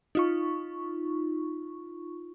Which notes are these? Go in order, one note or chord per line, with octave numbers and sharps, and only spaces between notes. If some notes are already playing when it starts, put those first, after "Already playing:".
D#4 F4 C#6